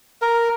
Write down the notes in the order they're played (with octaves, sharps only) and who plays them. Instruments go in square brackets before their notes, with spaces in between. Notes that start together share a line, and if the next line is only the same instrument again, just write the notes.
[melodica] A#4